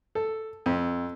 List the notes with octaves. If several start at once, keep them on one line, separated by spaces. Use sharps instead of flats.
A4
F2